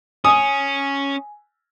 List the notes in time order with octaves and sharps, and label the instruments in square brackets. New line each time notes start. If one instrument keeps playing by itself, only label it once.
[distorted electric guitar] C#4 [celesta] G#5 [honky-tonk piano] D#6